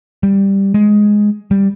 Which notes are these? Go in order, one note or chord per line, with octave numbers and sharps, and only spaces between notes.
G3
G#3
G3